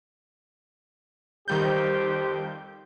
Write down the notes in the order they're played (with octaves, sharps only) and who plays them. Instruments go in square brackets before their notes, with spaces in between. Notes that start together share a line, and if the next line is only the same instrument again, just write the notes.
[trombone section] F2 G4 C5 [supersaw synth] D#3 G3 G6